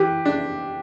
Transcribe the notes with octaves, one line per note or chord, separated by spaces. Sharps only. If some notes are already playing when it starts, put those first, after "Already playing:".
Already playing: E3 G4
D4